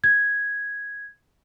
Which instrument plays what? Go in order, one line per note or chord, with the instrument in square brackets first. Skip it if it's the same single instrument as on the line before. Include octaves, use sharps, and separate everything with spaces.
[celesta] G#6